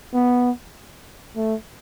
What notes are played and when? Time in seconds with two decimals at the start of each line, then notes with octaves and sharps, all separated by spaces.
0.14 B3
1.36 A3